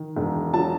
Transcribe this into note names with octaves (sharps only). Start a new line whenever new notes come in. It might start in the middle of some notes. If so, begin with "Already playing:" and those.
Already playing: D#3
E1
F#3 A5